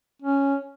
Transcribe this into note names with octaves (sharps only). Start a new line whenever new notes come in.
C#4